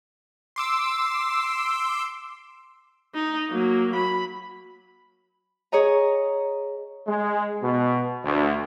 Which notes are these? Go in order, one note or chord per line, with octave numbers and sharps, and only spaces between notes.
C6 D6 E6
D#4
F#3 A#3
B5
G#4 C#5 D#5 A#5
G#3
B2
D2